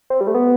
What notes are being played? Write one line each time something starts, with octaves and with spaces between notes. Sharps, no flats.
C4
G3
A3
B3